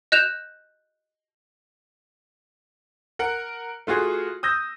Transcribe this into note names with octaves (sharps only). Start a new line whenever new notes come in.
D#5 F#6 G6 E7 F7
A#4 F#5
A3 F4 F#4 G#4
D#6 E6 G6 A#6